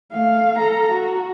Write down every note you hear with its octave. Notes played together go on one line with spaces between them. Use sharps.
A3 F5
A4 A#5
F#4